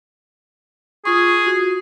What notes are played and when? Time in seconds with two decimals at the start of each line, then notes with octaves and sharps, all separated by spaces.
1.05 F4 G#4 C#6
1.47 F#4